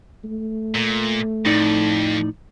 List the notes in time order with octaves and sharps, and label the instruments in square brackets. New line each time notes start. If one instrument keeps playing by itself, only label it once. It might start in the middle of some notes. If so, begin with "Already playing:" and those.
[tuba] A3
[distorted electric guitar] A#2
[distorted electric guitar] F2 [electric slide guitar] A2 D#4 D5